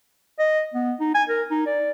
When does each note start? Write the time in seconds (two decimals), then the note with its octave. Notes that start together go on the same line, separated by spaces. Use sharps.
0.39 D#5
0.74 B3
1.00 D#4
1.15 G#5
1.29 A#4
1.51 D#4
1.67 D5